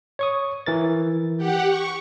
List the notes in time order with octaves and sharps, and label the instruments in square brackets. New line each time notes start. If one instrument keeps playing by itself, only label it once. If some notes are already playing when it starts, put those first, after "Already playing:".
[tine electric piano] C#5 C#6 D#6
E3 A#4 A6
[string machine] G4 F#5
C#6